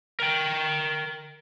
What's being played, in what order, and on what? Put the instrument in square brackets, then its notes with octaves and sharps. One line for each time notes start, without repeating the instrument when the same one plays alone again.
[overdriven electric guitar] A#4 G5